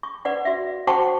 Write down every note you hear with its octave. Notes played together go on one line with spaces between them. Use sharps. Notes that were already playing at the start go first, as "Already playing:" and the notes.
C#6
B4 D5 F#5
F#4 E5
F#4 C5 F#5 G5 A5 C#6